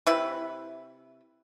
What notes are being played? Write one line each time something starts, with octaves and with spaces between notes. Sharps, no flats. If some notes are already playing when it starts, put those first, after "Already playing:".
C3 E4 B4